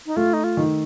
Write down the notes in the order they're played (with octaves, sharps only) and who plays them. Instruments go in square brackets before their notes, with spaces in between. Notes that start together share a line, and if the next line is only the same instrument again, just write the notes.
[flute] D#4
[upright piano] A3 [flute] F4
[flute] D#4
F4
[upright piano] D#3